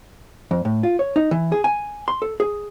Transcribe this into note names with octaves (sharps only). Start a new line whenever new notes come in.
F2
A2
F4
C#5
D#4
E3
G#4
G#5
C6
A4
G#4